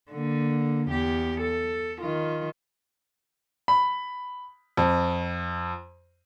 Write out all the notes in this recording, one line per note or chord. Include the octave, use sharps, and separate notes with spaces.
D3 A#3
E2 G4
A4
D#3 F4
B5
F2